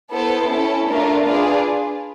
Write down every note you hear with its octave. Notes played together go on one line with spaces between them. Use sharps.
B3 E4 A4 C5
C#4 E4 A4
A3 D4 F4 A#4
D4 F4 G#4 B4 D5